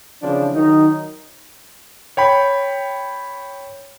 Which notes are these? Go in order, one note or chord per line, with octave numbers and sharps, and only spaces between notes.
C#3 E3 F3 C4 D4
D#3 F#3 D#4
C#5 G5 B5